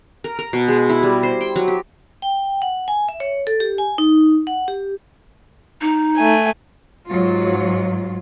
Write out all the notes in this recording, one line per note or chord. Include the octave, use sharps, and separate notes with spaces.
A#4
A#4
B2
G#3
E4
G3
C5
G5
F#3
G4
G5
F#5
G#5
E5
C#5
A4
G4
G#5
D#4
F#5
G4
D#4
A3 G#5
G#2 F#3 F4